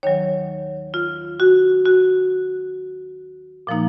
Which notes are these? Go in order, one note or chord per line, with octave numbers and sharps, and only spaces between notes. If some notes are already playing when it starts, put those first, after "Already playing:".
D#2 D#3 F#3 C#5
F4
F#4
F#4
A#2 F3 A#3 D#4